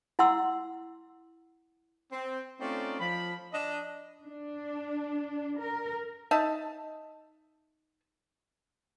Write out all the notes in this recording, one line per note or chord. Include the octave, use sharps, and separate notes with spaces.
E4 F#5 C6 E6
C4
A3 C4 C#4 D#4 F4 D5
F3 B5
D4 D#5
D4
A#4
D#4 E5 A5